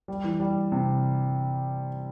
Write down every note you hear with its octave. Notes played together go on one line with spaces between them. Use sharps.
G3
E3
G3
C3